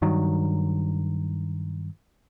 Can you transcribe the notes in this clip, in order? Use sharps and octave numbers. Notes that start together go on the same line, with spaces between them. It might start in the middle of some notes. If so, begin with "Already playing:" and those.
G2 D#3 F#3